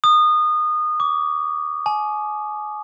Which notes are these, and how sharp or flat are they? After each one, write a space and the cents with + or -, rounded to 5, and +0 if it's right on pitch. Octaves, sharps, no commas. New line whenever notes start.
D#6 -25
D6 -35
G#5 +35